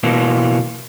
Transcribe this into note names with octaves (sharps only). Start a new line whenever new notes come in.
B2 E3 A#3